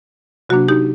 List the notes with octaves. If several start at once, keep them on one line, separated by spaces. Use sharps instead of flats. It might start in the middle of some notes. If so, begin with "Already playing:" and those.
C3 F#3 A#3 D4 F#4
D#4 G4